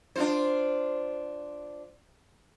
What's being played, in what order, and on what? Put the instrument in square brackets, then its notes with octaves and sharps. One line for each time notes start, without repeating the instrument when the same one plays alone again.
[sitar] D4 F4 C5